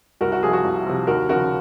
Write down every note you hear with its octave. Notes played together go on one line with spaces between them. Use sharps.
C2 F#4 A#4
F#4
C3 F3 G#4
F#4
C2
C3 F3
D#2 F#4 A#4
C#3 F3 F#4 A#4